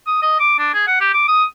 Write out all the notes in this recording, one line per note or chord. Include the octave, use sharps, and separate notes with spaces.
D#6
D#5
D6
D4
G#4
F#5
G4
D6
D#6